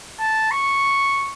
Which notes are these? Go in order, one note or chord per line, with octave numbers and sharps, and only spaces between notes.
A5
C#6